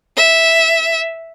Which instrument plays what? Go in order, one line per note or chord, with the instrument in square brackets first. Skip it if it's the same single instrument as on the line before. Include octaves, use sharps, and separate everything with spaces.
[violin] E5